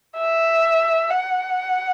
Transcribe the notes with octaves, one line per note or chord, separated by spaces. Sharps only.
E5
F#5